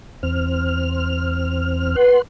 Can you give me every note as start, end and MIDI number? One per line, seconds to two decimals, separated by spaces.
0.23 1.96 40
0.23 1.96 60
0.23 1.96 89
1.96 2.16 71
1.96 2.22 78
1.96 2.22 84